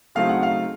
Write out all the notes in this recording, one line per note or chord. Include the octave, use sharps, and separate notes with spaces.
C#3 F#3 A3 C4 D#4 F5
F#5
F5